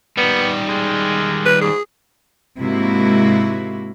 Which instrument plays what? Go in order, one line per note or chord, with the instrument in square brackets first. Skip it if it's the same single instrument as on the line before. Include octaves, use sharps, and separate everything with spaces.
[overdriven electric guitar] D#3 G3 [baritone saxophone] B3
[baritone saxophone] G#3
[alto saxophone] B4
[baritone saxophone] G#2 [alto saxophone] G#4
[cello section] G#2 C3 G#3 A#3 E4 F#4